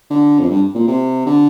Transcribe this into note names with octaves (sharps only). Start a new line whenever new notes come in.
D3
F2
G2
A#2
C3
D3